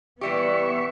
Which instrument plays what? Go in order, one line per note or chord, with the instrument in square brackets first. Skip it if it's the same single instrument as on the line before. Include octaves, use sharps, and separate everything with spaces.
[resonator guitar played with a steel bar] E3 G3 G4 [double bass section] B3 [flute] E5 [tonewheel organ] C#6